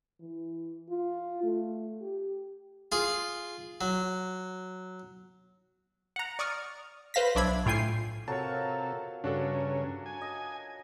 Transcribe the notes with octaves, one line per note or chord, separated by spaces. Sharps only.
E3
F4
A3
G4
F4 G#4
F#3
F#5 A#5
D5 C#6 D#6 F6
B4 C5 F5 A#6 B6
B1 F#3 D4 E5 B5 G#6
A2 F4 G5 G#5 C7
C3 F#3 F4 A4 A#4 C#5 A5
G2 C#3 C#4 D4 F#4 A4
G#5
D#5